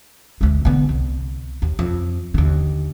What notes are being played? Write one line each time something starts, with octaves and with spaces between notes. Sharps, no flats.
D2 G#3
D3 B3
C2
D#2
F2
D#2 D3